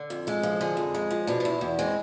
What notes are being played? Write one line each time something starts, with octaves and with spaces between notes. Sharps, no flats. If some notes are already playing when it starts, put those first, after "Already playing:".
Already playing: D3
F2
G#3 A4
F3
D3 G#4
F2
G#3
F3
B2 D4
D4
E2 E4
E2
G#3 C4